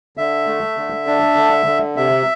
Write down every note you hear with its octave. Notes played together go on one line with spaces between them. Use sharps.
D3 E5
A3
D3
D4
D3
D3
C3 E5